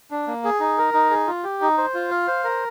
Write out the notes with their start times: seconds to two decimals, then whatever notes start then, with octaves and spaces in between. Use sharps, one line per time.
0.11 D4
0.27 A#3
0.44 G#4
0.60 D#4
0.78 A#4
0.94 D#4
1.10 G#4
1.27 F4
1.44 G4
1.61 D#4
1.78 C5
1.94 F4
2.10 F5
2.27 C5
2.44 A#4